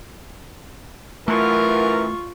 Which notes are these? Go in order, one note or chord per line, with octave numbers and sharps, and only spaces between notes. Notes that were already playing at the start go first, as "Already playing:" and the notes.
F#2 E3 A3 F4 A#4 C#6